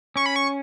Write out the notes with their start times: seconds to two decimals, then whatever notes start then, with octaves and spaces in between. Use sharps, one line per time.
0.16 C#4 C#6
0.26 B5
0.36 C#6